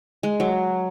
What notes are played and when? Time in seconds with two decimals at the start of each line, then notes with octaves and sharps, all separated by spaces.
0.23 G#3
0.40 F#3